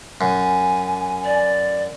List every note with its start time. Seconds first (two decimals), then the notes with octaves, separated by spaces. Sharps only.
0.21 F#2 G#5
1.25 D5